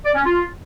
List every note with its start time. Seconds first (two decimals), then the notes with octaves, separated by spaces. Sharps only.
0.05 D5
0.15 C#4
0.24 F4